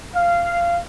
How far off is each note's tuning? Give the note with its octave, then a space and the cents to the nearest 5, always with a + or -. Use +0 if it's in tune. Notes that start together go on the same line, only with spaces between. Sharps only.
F5 -15